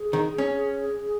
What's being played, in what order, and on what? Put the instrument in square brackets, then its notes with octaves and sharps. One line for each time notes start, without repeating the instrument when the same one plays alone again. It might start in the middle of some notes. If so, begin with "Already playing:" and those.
Already playing: [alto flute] G#4
[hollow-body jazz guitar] D#3
C#4